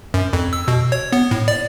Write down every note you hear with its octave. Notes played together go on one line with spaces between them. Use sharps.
F#2
F2
E6
B2
C#5
B3
A2
D5